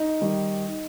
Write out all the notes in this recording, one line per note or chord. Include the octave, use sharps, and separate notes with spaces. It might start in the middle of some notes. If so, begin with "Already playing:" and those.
Already playing: D#4
D#3 G3